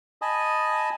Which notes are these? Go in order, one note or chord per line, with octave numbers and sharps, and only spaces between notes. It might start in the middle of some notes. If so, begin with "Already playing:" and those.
D#5 G#5 A5 B5 D#6